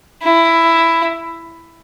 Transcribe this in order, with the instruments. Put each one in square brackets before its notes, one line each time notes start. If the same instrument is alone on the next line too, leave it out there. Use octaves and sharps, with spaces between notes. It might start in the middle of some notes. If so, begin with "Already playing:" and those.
[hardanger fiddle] E4